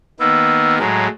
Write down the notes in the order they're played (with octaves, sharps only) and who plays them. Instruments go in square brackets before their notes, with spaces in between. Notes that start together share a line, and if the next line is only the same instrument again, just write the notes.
[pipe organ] D#3 A#3 B3 [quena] E6
[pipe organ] A2 F#3 G#3 [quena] A#5